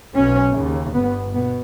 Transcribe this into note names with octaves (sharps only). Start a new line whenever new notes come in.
B1 B2 C#4
D#2 C#3
G1 G2 B3
B2 B3